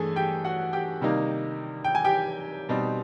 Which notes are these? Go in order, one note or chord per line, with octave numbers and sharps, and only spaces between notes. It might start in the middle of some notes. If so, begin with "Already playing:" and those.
Already playing: G2 E3 A3 G#4 A4 G#5
G4 G5
F#4 F#5
G4 G5
C3 D#3 G3 A#3 D#4
G5
G#5
G4 G5
B2 G3 C4 D#4